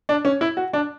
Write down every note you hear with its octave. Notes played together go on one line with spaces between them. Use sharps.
D4
C#4
E4
F#4
D4